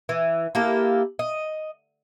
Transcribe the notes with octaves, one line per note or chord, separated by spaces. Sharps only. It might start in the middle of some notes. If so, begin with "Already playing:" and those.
E3
A#3 E4 G4 A4
D#5